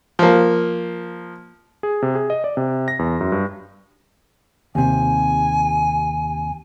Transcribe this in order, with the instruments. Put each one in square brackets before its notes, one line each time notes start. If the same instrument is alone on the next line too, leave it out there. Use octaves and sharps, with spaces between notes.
[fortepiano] F3 A#3
[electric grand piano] G#4
C3
G#4
D#5
D5
C3
A#6
E2
F#2
G2
[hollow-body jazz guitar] D#2 C3 [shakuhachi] G#5